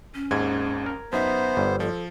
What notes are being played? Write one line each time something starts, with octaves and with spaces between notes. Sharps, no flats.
C#4
G#1 D#2 G#2 G#6
A#4
F#2 B3 D#4 C5 E5
G1 G2
F3 A4